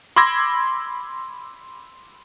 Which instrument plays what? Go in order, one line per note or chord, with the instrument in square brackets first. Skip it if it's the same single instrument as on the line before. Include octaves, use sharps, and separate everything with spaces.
[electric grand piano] B5 C6 D6 E6 G#6 A#6